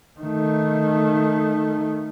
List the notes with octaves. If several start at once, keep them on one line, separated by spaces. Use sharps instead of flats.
D#3 A3